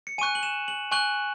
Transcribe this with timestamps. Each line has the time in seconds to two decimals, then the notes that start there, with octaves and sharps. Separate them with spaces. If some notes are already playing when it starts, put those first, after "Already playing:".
0.07 C#7
0.18 G#5 D#7
0.21 C#6 F#6
0.35 F#7
0.43 E7
0.68 F#7
0.92 G#5 C#6 F#6 F#7